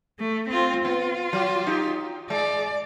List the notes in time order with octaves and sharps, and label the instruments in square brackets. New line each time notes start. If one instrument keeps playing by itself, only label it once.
[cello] A3
C4 F4
[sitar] B3 [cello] F4
[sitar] F#3
D#4 G4
[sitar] G#3 [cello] D5